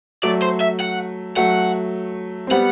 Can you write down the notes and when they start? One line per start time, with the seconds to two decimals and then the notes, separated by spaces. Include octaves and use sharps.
0.23 F#3 A3 D5
0.42 C5
0.61 E5
0.80 F#5
1.36 F#3 A3 F#5
2.47 C4
2.51 G3 B3 F#5